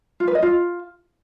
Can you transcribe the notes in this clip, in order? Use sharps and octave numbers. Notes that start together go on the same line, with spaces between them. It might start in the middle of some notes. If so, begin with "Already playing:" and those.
F4
B4
D#5
F4